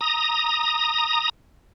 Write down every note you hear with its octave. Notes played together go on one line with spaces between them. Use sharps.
A#5 D#6